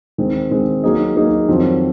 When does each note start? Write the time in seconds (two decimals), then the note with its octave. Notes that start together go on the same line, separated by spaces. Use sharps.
0.18 D#3 G#3 C4
0.51 D#3 G#3 C4
0.83 F#3 A#3 D#4 G#4 D#5
1.16 F#3 A#3 D#4 G#4 D#5
1.49 F2 D#3 F#3 C4